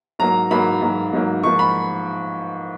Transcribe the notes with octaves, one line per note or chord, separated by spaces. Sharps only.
G#2 F#3 A#3 A#5
G#2 F#3 A#3 B5
G#2 F#3 A#3
G#2 F#3 A#3
G#2 F3 A#3 C#6
B5